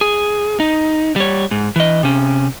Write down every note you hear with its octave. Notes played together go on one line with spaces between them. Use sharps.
G#4
D#4
G3 C#5
G#2
E3 D#5
C3 C#4